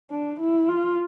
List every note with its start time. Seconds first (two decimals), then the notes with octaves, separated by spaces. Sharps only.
0.11 D4
0.40 E4
0.68 F4